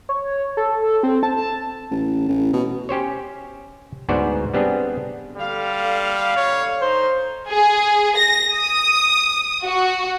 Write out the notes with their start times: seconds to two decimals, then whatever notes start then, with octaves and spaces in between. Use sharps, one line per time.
0.09 C#5
0.57 A4
1.03 C4
1.23 A5
1.91 A1
2.29 A1
2.54 B2
2.89 C#4 G4 C5 C#5
4.09 D2 G#2 B3 F#4 C5 D5
4.54 G3 B3 C4 D4 G#4
5.37 D3 G3 F5
6.36 C#5
6.82 D#4 C5
7.49 G#4
8.14 A#6
8.54 D#6
9.65 F#4